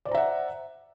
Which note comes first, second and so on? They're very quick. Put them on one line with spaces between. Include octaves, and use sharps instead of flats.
D5 C5 A#5 E5 F#5